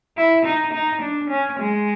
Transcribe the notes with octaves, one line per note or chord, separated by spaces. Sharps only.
E4
D#4
D#4
D4
C#4
G#3